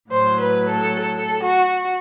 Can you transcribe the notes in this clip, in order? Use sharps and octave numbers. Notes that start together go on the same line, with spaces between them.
A2 F#3 C5
B4
A4
A4
F#4